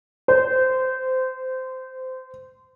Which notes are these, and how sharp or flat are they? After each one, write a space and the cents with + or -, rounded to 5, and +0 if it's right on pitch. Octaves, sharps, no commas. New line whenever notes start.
C5 -20